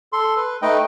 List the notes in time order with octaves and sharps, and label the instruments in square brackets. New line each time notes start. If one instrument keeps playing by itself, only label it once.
[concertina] A4 C6
B4
A3 D#4 B4 D#5 G5